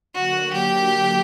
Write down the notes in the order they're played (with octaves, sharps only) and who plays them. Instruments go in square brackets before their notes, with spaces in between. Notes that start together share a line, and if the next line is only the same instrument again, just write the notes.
[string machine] D3 F#3 A#3 [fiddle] F#4
[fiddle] G4